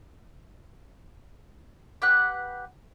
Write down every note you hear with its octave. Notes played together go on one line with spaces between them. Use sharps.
G4 B4 F#5 F#6